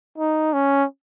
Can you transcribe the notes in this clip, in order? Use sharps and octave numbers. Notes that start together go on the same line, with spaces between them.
D#4
C#4